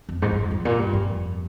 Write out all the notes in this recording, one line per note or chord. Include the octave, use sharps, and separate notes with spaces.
F2
G#2
G2
F2
G2
A#2
G2
F2